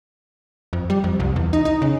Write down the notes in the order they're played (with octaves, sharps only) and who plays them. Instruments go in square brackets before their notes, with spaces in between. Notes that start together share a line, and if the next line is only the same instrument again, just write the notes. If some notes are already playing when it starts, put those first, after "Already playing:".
[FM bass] F2
G3
F2
C2
E2
D#4
D#4
C#3